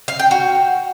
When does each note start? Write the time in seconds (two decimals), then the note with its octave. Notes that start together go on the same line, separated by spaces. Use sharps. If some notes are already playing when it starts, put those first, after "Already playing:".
0.08 F5
0.19 G5
0.31 F#4